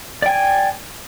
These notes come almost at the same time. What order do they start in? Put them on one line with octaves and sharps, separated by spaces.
D5 G5 G#5